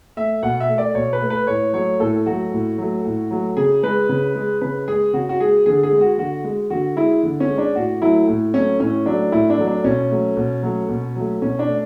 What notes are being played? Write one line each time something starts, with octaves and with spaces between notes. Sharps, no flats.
A3 E5
B2 F#5
E5
A3
D5
B2 C#5
B4
A3
B4
A2 C#5
F#3 A3 C#5
A2 A4
F#3 A3 F#4
A2
F#3 A3
A2
F#3 A3
C#3 G#4
G#3 B4
C#3
G#3
C#3 B4
G#3 G#4
C#3 F#4
F#4
G#3 G#4
D3 G#4
G#4
G#3
F#4
D3 F#4
G#3
D3 F#4
G#3 E4
D3
C#4
G#3
D4
A2 F#4
F#3 A3 E4
A2
F#3 A3 C#4
A2 C#4
F#3 A3 D4
A2 E4
D4
F#3 A3
D4
B2 C#4
F#3 A3
B2
F#3 A3
B2
F#3 A3
B2 C#4
D4
A3